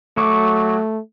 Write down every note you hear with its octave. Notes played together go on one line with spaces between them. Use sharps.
F#3 A3 C#6 D6